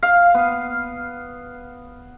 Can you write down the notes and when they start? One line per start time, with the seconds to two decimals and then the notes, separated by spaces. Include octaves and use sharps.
0.03 F5
0.34 B3